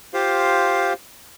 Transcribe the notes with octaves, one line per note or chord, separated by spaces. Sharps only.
F4 G4 C5 F5